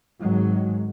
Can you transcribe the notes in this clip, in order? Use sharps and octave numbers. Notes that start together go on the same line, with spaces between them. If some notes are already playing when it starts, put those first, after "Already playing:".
G#1 G#2 D#3 F#3 G#3